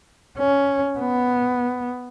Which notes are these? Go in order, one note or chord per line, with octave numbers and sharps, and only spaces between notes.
C#4
B3